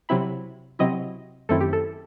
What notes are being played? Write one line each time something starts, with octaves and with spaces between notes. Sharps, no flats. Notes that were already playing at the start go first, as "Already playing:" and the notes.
C3 F#3 C4 E4 B5
C3 F#3 C4 E4 D#5
F#2 D#3 A3 C4 E4 A4
G4
A4